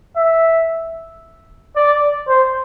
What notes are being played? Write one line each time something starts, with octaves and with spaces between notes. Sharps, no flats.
E5
D5
C5